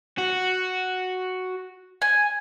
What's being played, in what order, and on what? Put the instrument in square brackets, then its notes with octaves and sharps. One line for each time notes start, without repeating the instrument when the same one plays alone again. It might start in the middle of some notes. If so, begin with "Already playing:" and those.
[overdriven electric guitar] F#4
[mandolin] G#5